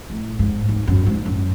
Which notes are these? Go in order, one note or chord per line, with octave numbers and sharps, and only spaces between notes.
A2
G#2
G#2
F#2
G#2
F#2